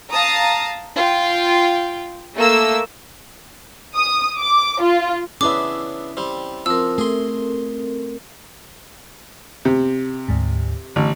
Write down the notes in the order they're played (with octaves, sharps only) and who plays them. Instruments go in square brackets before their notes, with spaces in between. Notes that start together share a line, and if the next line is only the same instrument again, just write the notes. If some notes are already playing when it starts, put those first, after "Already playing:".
[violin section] F5 A5 A#5 D#6
F4 G5
A3 A#3 E6
[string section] D#6
D6
F4
[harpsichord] B3 D4 G#4 [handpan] C#4 E4 E5 [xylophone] D6
[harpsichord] G3 C4
[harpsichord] F3 [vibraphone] C4 A#4 [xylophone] E6
[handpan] A3 [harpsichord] G#4 C6
[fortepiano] C3
[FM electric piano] D2 G#2
[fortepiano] A1 [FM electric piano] D3